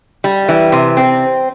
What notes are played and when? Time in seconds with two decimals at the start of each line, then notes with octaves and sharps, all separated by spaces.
0.24 G3
0.48 E3
0.72 C3
0.97 C4